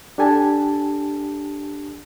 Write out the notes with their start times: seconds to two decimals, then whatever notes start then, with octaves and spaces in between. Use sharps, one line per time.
0.18 D4 G4 A4 G#5 A5